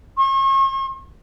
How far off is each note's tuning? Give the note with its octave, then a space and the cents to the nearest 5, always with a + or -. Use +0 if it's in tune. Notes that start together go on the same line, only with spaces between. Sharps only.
C#6 -45